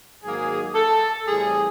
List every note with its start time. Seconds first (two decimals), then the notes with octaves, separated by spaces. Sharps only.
0.23 G#2 D#3 F#3 A#3 G#4
0.75 A4
1.27 A2 E3 G3 C4 G#4